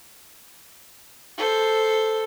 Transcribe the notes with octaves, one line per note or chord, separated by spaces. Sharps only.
A4 C5